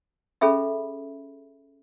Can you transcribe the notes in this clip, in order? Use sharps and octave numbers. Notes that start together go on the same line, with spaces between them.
C#4 G#4 A4 E5 B5